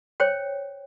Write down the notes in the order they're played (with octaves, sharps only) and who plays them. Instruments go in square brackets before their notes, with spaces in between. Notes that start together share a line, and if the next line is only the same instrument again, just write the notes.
[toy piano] C5 C#5 G5